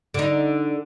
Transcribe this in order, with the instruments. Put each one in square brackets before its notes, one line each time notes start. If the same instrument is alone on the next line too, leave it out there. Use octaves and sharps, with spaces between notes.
[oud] D3 D#4